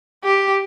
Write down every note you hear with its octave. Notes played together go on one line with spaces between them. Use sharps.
G4